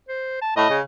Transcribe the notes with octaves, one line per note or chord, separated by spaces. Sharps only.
C5
A5
A2 D#5
C#3